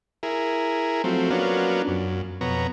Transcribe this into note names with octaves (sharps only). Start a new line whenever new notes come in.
E4 G#4 A#4
F3 F#3 A3 C4
F#3 A#3 B3 C#4 D4 F4
F#2
F2 B2 B3 C#5 A#5